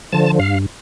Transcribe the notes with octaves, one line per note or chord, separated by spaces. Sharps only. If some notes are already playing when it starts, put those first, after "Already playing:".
D3 F3 A5
G2 F5